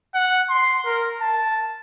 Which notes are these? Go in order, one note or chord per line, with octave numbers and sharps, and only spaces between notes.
F#5
C6
A#4
A5